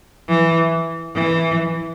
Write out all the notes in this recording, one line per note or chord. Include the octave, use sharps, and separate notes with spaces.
E3
E3